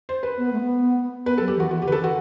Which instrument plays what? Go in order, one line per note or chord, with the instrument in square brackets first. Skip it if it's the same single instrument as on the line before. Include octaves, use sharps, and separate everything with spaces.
[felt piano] C5
B4
[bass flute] B3
A3
B3
[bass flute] B3 [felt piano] B4
[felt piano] A4
[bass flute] F#3
[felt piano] G4
[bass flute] E3 [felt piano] F#4
[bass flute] E3 [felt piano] F#4
[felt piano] G4
[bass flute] D3 [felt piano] B4
[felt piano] A4
[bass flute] E3 [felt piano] F#4